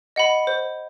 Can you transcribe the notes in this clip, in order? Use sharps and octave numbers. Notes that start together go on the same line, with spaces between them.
D#5 F#5 B5
C5